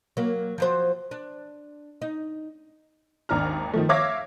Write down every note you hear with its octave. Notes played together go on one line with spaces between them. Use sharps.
F#3 A#3
F3 F#3 C5
D4
D#4
G#1 D#2 D4 A#5 F6
D#3 F3 A3
C#5 E5 F5 D6 G#6 A#6